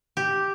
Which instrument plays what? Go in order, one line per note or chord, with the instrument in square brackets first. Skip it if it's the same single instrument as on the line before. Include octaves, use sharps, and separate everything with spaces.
[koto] G4